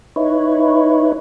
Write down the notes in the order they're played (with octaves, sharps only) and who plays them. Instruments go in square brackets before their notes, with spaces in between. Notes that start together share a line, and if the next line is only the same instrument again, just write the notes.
[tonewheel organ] D#4 E4 B4 C#5